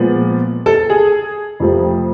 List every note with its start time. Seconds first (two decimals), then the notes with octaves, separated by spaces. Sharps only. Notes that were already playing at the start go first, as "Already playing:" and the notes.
Already playing: A#2 F3 G#3 B3
0.66 A4
0.90 G#4
1.60 F2 C3 F3 A3